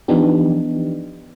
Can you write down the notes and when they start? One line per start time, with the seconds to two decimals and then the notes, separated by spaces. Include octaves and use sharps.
0.08 E3 F3 B3 D4 D#4 G4